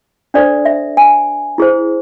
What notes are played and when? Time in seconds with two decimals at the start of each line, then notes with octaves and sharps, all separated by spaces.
0.34 D4 A4 C5 D5
0.65 E5
0.97 G#5
1.58 E4 G#4 C5